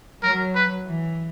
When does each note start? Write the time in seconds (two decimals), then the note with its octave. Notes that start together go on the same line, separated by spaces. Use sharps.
0.23 F#3 A#4
0.55 B4
0.87 E3